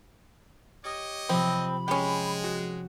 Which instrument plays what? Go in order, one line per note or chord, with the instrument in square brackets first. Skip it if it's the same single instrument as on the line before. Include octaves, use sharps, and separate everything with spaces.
[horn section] G4 C#5 D#5
[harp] C3 F3 [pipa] C4 [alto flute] B5
[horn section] G#3 [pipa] C#4 G4
[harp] F#4